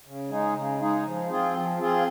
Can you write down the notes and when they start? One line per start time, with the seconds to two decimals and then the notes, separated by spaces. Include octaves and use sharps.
0.05 C#3
0.29 G#3 D#4 G#4
0.55 C#3
0.79 G#3 D#4 G#4
1.05 F3
1.29 C4 F4 G#4
1.54 F3
1.78 C4 F4 G#4